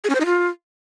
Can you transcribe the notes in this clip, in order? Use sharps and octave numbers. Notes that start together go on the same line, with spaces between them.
G#4
C#4
C5
D#4
F4